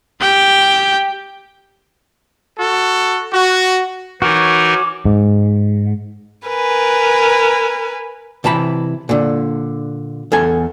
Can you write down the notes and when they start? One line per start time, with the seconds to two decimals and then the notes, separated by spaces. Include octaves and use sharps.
0.21 G4 G5
2.59 F#4 A4
3.31 F#4
4.22 E3 D#4 F#4 A#4 C#5 D6
5.05 G#2
6.48 A#4 B4 G#5
8.44 C3 E3 A5 B5
9.09 A#2 D3
10.32 E2 A4 G#5